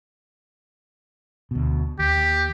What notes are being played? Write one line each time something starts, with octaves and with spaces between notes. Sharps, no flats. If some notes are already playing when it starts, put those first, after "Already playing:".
D2 B2
D#2 G4